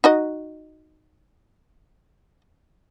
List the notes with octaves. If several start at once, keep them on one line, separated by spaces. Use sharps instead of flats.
D#4 F#4 D#5